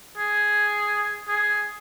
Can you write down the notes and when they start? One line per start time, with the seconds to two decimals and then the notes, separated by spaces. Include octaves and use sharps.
0.17 G#4
1.28 G#4